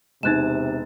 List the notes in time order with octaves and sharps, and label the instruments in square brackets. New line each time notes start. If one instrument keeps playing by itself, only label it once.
[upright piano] E1 A6 [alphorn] C3 [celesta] D#4 F#6 E7